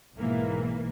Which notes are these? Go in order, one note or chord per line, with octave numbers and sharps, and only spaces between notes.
B1 G#2 E3 A#3